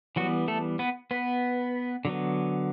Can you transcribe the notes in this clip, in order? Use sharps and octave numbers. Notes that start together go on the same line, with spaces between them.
E3 F#3 G3 B3 F#4
A3 A4
B3 B4
B3 B4
D3 F#3 B3